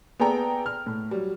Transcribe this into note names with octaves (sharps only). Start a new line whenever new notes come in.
B3 G#4 A4 D5 G5 A#5
F6
A2
F#3 G3